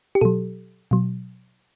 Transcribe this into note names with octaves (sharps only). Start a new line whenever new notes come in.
G4
B2 F#3 A4
B2 F#3